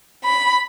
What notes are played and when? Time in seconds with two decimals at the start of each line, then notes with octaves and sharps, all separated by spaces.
0.24 B5